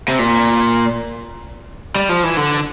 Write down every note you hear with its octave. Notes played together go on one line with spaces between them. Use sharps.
C3
A#2
G3
F3
E3
D3